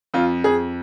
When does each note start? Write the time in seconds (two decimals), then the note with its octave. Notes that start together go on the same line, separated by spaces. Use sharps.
0.14 F2 F4
0.44 F2 G#4